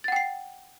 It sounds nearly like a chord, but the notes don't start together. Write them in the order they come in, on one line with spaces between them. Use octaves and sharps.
A6 F#5 G5 C7